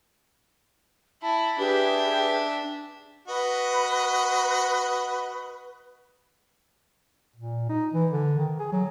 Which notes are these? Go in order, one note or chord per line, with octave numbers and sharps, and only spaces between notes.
E4 A5
D4 G4 G#4 B4 E5
F#4 B4 D#5
A#2
D#4
E3
D3
D#3
G#4
F#3